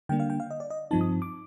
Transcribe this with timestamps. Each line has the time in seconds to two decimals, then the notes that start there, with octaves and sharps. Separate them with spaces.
0.09 D3 G3 A#3 D4 G5
0.20 F5
0.30 G5
0.40 F5
0.51 D#5
0.60 D5
0.70 D#5
0.91 G2 F3 C4 D#4 A5
1.01 D#6
1.22 D6